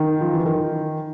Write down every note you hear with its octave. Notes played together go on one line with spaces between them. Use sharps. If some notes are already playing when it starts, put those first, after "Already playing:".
Already playing: D#3
F3
E3
D#3